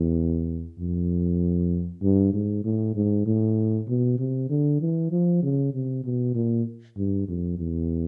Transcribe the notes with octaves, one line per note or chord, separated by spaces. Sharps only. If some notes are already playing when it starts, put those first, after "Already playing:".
Already playing: E2
F2
G2
G#2
A2
G#2
A2
B2
C3
D3
E3
F3
C#3
C3
B2
A#2
G2
F2
E2